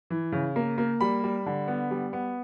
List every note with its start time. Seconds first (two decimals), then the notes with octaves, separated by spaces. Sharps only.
0.10 E3
0.32 C#3
0.56 A#3
0.78 A#3
1.01 G3 B5
1.24 G3
1.46 D3
1.68 B3
1.91 G3
2.13 B3